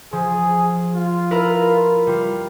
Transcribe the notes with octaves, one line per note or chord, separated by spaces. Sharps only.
F3 G#4
F4
E4 A#4 B4
G3 F4